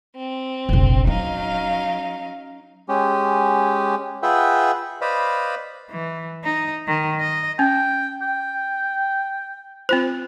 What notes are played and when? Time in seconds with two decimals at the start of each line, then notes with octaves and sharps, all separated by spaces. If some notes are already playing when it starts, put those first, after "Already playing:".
0.17 C4
0.69 F1 A#1
1.07 F#3 C#4 D#4 F5
2.89 G#3 C#4 G4
4.23 F4 G#4 B4 E5 F#5 G5
5.01 B4 C5 D5 D#5 F5 B5
5.91 E3
6.44 D#4
6.87 D#3
7.20 D#5
7.59 C#4 G5
8.22 G5
9.89 C4 F4 C5